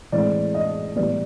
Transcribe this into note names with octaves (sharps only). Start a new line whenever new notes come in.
A2 E3 G#3 C4 D5
D#5
A2 E3 G3 B3 D5